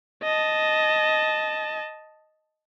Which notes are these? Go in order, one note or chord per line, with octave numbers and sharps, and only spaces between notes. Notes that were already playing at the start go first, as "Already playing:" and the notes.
D#5 A5